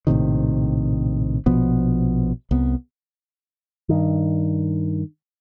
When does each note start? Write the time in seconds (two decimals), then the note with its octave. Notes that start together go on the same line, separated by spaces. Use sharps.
0.07 A#1 A2 C3 D#3
1.46 A#1 B2 F3 B3
2.51 C2 B3
3.89 G2 D#3